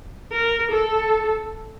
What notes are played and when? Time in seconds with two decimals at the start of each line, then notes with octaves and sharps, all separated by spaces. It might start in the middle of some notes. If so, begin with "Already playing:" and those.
0.32 A#4
0.71 A4